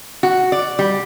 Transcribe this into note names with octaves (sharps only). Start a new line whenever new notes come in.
F#4
D5
G3